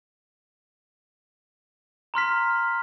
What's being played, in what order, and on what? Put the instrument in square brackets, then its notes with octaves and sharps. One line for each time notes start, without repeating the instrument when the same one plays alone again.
[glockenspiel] A#5 C6 F6 B6